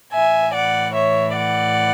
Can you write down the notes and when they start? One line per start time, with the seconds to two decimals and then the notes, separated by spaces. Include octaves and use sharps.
0.13 A2 E3 E5 G#5
0.53 D5 F#5
0.95 C#5 E5
1.36 D5 F#5